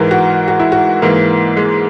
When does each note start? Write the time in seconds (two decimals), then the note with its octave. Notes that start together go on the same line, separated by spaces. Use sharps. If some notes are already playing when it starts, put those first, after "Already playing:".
Already playing: G#2 E3 A#4
0.11 F#4
0.48 F#4
0.60 E4
0.72 F#4
1.02 G#2 E3 A#3
1.57 G#3